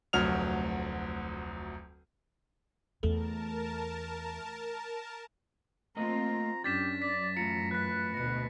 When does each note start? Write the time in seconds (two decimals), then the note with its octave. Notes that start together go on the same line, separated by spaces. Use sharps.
0.13 F1 D2 F#3 F6 F7
3.03 E2 A3 A#4 A5
5.96 A3 A#3 C4 F4 D#5 A#5
6.64 F#2 C#4 D4 G4 A6 B6 E7
7.02 D5 B6
7.37 E2 A2 F4 A#5 C#7
7.71 B4 F#6 B6
8.14 D2 B2 A#6 C#7